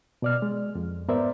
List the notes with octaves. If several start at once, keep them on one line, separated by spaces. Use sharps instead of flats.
B2 D5 F6
G#3
F2
G#2 B3 A#4 C5 D5 E5